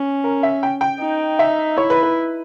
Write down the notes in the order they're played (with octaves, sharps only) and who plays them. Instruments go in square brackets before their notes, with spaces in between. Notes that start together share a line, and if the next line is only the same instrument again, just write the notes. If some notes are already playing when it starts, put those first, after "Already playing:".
Already playing: [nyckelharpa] C#4
[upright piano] A#4
E5
G5
G5
[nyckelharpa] D#4
[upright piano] E5
[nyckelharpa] E4 [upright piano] C#5
[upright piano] B4
B4